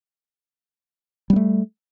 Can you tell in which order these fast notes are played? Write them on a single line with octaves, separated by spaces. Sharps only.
G3 B3 A3